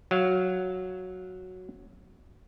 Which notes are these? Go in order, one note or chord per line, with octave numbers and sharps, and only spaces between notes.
F#3 F5